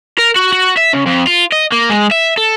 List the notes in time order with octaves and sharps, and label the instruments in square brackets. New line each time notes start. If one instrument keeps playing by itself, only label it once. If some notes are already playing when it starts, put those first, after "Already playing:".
[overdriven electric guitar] A#4
F#4
F#4
E5
C#3
F2
F4
D#5
A#3
G#3
E5
A4